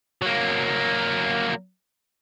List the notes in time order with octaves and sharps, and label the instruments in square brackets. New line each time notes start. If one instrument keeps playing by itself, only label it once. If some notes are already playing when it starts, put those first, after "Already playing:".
[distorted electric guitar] F#3 A#3